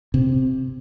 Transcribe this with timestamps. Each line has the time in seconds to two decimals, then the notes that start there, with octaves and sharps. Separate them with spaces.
0.14 C3